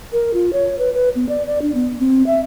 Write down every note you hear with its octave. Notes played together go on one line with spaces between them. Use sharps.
A#4
F4
C#5
B4
B4
B3
D5
D5
D4
B3
C4
E5